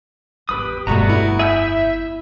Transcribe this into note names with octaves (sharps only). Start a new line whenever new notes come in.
G#1 E2 G4 B4 D#6
G1 F2 B2 G3 A3 B3 F#4 A#5
E4
G#4 E5 E6 G6